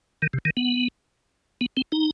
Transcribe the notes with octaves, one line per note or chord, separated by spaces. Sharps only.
D#3
C3
D#3
B3
B3
C4
D#4